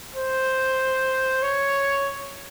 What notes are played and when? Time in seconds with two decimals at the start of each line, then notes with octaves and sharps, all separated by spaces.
0.16 C5
1.43 C#5